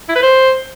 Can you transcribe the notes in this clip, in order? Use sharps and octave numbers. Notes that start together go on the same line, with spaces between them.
E4
B4
C5